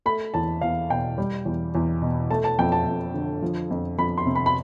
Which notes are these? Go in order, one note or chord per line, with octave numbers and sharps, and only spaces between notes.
A3 B5
E2 A5
E2 F5
B2 G5
G3
E2
E2
B2
A3 A5
A5
F2 G5
A5
F2
D3
F3
F2
F2 B5
C6
C3
B5
B5